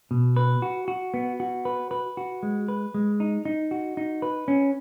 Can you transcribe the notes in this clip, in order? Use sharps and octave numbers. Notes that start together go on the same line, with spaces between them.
B2
B4
F#4
F#4
B3
F#4
B4
B4
F#4
G#3
B4
G#3
D#4
D#4
F#4
D#4
B4
C#4